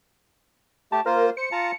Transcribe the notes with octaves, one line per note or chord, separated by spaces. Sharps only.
A3 G4 A5
A#3 F4 A#4 C5
C5 C#7
F4 A5 A#5